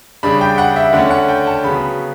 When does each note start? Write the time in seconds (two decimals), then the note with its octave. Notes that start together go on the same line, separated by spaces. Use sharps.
0.23 C#3 G3 D4 B5
0.41 G5
0.58 F#5
0.76 E5
0.93 D3 A3 C#4 F#5
1.10 F#5
1.28 G5
1.47 A5
1.64 C#3 F#3 B3 B5